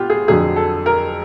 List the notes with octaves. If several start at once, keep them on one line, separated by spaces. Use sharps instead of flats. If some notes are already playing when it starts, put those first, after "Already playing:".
Already playing: B3 F4 G4
G#4
F2 D3 F#3 G#4
A4
A#4